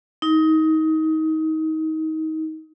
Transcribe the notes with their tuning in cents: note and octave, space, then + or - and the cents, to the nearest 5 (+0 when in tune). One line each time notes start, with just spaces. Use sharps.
D#4 +25